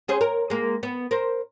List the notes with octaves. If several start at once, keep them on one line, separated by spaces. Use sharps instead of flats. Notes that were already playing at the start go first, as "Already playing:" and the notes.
C#4 G#4 C5
A#4
G#3 A#3
B3
A#4 C5